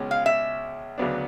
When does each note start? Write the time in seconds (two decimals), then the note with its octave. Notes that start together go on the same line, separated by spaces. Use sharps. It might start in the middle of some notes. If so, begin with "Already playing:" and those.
Already playing: C#2 B2 G#3 C#4
0.11 F5
0.26 E5
0.98 D2 C#3 F#3 B3 D4